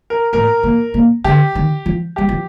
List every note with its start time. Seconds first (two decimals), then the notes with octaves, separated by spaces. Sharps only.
0.10 A#4
0.33 A2 A#4
0.63 A#2
0.94 A#2
1.24 D3 G4
1.55 D#3
1.86 F3
2.16 G3 G4
2.29 F3